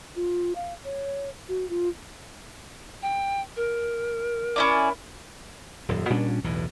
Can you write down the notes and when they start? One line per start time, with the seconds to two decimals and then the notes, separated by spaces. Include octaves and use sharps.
0.16 F4
0.56 F5
0.85 C#5
1.49 F#4
1.70 F4
3.02 G5
3.56 A#4
4.56 C#4 E4 D5
5.88 D#1 F#2
6.10 A#2 G3 C#4 D4
6.44 B1 E2 A2 E3